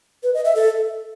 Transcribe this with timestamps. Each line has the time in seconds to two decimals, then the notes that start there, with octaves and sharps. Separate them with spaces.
0.23 B4
0.34 D#5
0.45 E5
0.55 A4